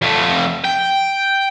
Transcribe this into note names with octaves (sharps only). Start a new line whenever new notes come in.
F2 A3
G5